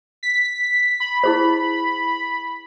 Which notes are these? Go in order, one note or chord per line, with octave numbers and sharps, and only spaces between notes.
B6
B5
E4 G#4 C5